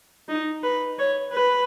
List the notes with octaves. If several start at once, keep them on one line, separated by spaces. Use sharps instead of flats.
D#4
B4
C#5
B4